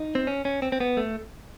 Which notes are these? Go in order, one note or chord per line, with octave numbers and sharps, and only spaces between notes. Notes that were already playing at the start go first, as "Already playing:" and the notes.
Already playing: D#4
C4
C#4
C#4
C4
C4
B3
A3